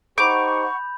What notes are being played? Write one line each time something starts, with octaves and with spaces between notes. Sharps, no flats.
D#4 G4 C5 F#5 B5 C#6 D6 G6